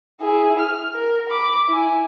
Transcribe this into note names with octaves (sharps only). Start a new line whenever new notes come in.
E4 G#4
F6
A#4
B5 D6
E4 G#5